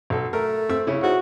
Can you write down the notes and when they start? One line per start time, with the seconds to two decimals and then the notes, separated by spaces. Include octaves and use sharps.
0.10 B1 A4
0.33 A3 A#4
0.69 C4 E5 E6
0.87 C#3 C#4 E4
1.03 G#2 F#4